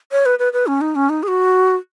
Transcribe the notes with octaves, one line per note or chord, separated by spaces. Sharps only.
C#5
B4
B4
B4
C#4
D#4
C#4
D#4
G#4
F#4